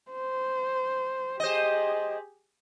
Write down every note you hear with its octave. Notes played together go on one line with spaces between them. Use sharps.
C5
G4 G#4 C5 D#5